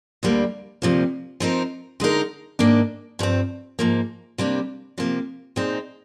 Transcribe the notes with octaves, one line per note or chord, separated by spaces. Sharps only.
D2 D3 G3 A#3
D2 C3 F3 A#3
F3 C4 D#4 A#4
D3 G#3 D#4 A#4
G#2 D#3 A#3 D4
G2 F3 C4
G#2 F3 A#3
C3 G3 A#3 D4
C3 F3 A#3
A#2 G#3 C4 D#4